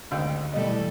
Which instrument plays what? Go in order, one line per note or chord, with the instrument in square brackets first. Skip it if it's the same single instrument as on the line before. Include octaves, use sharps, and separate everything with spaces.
[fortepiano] G#1 D2 G5
[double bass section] B2 E3 [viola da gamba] G3 A3 A4 [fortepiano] D#5